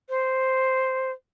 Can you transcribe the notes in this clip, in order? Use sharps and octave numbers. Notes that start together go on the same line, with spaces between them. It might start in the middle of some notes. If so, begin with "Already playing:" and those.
C5